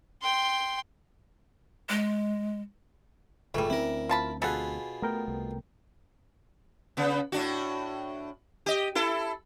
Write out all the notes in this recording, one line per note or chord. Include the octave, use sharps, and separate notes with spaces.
G5 C6
G#3
G1 C#2 A2 E3 G3 A3
D2 C4 C#4 E4 A#4
F3 F4 A5 B5
B2 F4 G#4 A4 F#5 G#5 B5
A3 B3 A#4 G5
C2 A3
C#3 B3
A2 D4 F#4
G4 D#5
E4 A4